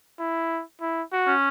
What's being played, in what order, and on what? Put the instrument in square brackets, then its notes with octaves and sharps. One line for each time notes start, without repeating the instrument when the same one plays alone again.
[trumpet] E4
E4
F#4
[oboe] C#4